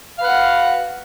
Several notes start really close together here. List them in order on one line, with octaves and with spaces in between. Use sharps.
F5 B4 F#5 F#4